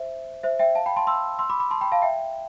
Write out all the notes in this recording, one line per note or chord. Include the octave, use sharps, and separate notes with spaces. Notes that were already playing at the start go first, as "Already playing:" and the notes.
Already playing: C5 E5
C5 E5
E5 G5
F5 A5
G5 B5
A5 C6
C6 E6
C6 E6
B5 D6
B5 D6
A5 C6
G5 B5
F5 A5
E5 G5